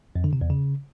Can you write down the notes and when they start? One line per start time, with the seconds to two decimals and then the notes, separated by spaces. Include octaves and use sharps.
0.16 F2
0.24 D3
0.33 C3
0.41 E2
0.50 C#3